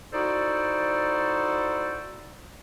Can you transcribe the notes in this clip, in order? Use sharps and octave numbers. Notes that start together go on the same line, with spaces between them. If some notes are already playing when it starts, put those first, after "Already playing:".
D#4 E4 F#4 A4 C5 D5